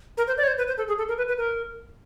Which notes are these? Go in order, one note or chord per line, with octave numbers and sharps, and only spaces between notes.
A#4
C5
D5
C#5
C5
B4
C5
A4
G#4
A4
A#4
B4
B4
A#4